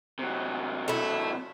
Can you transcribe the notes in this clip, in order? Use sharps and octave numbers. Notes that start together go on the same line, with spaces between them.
C3 F#3
A3 E4